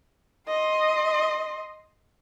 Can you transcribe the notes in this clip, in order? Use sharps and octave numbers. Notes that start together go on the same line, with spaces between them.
D#5 C6